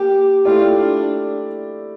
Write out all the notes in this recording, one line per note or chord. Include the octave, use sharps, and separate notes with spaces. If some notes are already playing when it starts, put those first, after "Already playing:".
Already playing: A#3 G4
A3 E4 F4 G4 D5
D4